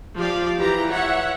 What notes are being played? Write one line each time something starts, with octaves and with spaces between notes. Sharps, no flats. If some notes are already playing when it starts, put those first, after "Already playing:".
F3 G4 D5 F5
E3 E4 G4 A#5
C#5 E5 F#5